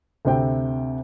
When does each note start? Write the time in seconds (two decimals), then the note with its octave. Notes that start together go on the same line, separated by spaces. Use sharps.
0.25 D2 C3 C4 G5